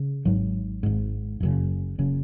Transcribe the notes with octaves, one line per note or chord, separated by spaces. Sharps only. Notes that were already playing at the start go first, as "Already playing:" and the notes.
Already playing: C#3
G#1 G#2 F#3
G#1 G#2
F#1 F#2 C#3
F#1 F#2 C#3